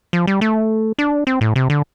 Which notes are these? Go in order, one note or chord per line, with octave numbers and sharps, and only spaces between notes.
F3
G3
A3
D4
C4
A2
C3
D3